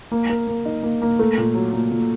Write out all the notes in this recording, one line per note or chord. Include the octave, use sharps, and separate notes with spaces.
A#3
A#4
A#3
D#4
A#3
A#3
A3
A#2
F#3
A#2
A#2